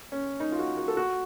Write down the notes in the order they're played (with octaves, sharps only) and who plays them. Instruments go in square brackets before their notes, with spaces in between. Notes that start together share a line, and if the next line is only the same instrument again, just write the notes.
[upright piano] C#4
D#4
F4
F#4
F#4
A4
F#4